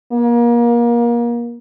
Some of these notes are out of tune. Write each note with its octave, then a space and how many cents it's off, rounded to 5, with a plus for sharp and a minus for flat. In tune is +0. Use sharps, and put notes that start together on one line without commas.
A#3 +30